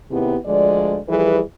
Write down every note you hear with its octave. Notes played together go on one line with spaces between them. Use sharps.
D#2 C3 B3 E4 G4 G#4
D2 F3 G#3 D5
E3 F3 G3 G#4 A4 B4